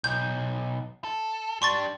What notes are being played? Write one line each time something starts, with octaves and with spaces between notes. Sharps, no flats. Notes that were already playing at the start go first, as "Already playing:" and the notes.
B1 G6
A4
G3 D4 C6 C#6 A6